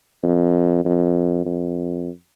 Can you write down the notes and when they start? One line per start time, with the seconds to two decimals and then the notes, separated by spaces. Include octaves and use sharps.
0.23 F2
0.85 F2
1.45 F2